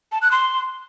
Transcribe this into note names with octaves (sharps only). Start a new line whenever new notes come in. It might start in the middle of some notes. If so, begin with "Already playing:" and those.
A5
F#6
C6